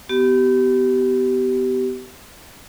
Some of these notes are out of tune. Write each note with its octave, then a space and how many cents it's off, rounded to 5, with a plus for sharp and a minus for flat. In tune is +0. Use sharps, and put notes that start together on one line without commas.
B3 +20 G4 -25